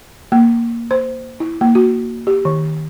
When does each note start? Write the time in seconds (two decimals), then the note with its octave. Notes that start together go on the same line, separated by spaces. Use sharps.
0.32 A#3
0.91 C5
1.40 E4
1.61 A#3
1.75 F#4
2.27 G4
2.45 D#3